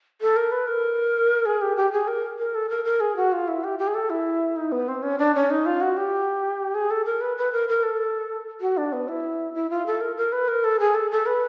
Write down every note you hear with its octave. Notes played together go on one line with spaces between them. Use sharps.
A4
A#4
B4
A#4
G#4
G4
G4
G#4
A#4
A#4
A4
A#4
A#4
G#4
F#4
F4
E4
G4
G4
G#4
A4
E4
D#4
B3
C4
C#4
D4
C#4
D#4
F4
F#4
G4
G#4
A4
A#4
B4
B4
A#4
A#4
A4
F#4
D4
B3
E4
E4
F4
A4
A#4
A#4
B4
A#4
A4
G#4
A4
A4
B4